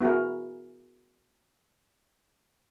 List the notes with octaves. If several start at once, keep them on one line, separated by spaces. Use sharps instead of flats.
B3 E4 F#4 G#4 A#4